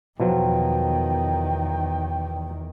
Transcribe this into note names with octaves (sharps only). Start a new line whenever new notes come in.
E2 B2 D#3 F3 F#3 G5